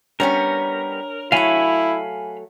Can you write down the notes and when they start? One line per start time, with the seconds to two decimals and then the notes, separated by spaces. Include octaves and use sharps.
0.20 G3 B3 C#4 D4 A#4 C#5
1.32 F#3 A3 E4 F5 G#5 B5